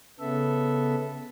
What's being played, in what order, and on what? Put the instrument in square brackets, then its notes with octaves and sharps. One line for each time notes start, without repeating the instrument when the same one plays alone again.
[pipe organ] C#3 B3 A4 E5